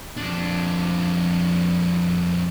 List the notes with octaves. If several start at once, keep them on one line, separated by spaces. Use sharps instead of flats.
F2 D4